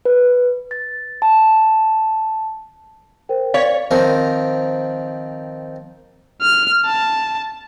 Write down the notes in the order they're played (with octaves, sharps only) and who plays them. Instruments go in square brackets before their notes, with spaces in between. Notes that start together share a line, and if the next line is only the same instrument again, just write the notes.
[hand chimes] B4
A6
A5
[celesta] A#4 C5 G5
[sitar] C#5 [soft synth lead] D5 [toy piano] F5
[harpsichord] D#3 F3 C4 A#4
[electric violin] F6
A5